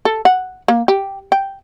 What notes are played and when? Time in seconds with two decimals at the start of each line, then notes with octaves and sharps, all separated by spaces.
0.05 A4
0.25 F#5
0.68 A#3
0.88 G4
1.32 G5